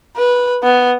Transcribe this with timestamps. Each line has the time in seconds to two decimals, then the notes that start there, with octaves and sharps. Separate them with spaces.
0.17 B4
0.64 B3